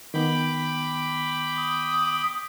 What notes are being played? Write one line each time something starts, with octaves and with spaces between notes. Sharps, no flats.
D#3 B3 G5 B5 D6
D#6